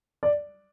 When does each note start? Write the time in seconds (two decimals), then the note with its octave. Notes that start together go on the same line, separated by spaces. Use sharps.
0.23 D5